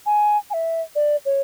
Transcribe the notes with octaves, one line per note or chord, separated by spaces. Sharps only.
G#5
G#5
E5
D5
C#5